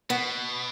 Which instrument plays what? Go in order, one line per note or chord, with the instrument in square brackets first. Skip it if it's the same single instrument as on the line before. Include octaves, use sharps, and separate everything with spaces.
[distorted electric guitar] B2 [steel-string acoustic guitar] B3